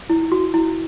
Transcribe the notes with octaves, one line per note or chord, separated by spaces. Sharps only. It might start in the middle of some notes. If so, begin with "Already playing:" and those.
E4
F#4
E4